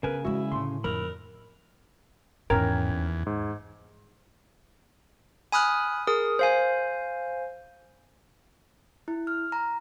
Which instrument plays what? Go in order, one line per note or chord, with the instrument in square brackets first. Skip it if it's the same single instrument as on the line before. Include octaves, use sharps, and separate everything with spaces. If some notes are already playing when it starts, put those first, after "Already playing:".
[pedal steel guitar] C#3 G#5 [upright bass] B3 D4 [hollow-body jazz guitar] A#4 [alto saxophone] B4
[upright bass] F3 G#3 [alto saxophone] E4 [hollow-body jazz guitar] F#4
[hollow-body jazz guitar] A2 C6 [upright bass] D3
[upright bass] F2 D3 [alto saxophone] A#4 [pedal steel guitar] B5
[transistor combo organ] E2 [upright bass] G#2 D#3 [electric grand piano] C#4 G5 G#6 [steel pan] A#4
[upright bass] D#2
[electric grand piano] G#2
[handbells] G#5 B5 D#6 F6 F#6
G#4 A#4 D#6
C5 F5 G#5
[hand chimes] E4
F6
A#5